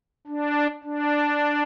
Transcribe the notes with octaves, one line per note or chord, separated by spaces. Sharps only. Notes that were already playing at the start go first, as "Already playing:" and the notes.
D4
D4